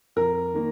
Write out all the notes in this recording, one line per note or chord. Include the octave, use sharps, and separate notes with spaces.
F2 A#4
D#3 A#3